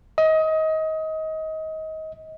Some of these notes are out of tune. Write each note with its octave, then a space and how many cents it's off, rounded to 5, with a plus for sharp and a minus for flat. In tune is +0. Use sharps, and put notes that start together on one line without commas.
D#5 +25